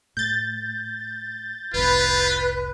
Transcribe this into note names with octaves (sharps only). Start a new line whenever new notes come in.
A2 G6 A6
F1 C2 F4 B4